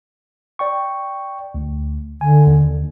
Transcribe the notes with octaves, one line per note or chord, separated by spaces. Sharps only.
D5 G5 C#6
D2
D3 G#5
D#2